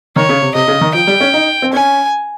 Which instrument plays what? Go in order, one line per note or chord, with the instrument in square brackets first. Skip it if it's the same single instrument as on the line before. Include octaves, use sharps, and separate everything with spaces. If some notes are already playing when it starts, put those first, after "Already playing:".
[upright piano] D#3 [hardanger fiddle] C#5
[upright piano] C#3
C3
[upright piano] C3 [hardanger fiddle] D#5
[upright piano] C#3
D#3
[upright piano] F3 [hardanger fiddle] G5
[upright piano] G3
C#4
D#4
C4
[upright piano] C#4 [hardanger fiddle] G#5